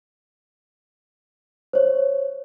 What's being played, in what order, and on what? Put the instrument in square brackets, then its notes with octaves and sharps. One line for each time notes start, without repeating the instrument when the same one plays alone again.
[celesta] C5 C#5